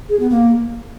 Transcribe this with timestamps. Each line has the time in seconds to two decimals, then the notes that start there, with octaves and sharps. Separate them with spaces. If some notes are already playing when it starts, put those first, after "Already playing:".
0.09 G#4
0.20 B3
0.30 A#3